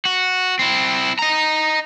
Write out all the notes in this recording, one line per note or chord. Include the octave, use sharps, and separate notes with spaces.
F#4
C4 E4
D#5 A#5